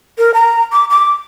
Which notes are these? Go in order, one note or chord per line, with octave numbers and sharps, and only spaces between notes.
A#4
A#5
D6
D6